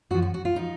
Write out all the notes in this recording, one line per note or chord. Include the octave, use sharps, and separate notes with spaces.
F#2 F3 F#4
F#4
F#4
F4
F3 D#4